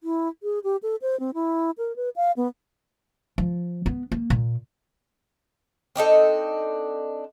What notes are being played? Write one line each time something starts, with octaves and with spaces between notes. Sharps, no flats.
E4
G#4
G4
A4
C5
C4
E4
A#4
B4
F5
B3
F3
B3
A#3
A#2
C4 D4 D#4 A4